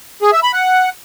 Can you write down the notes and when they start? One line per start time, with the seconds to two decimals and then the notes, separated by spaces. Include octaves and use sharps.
0.22 G#4
0.33 E5
0.43 B5
0.53 F#5